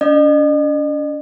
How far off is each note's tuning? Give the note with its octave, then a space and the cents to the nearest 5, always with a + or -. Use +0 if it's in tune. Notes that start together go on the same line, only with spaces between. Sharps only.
D4 -45 D#5 -45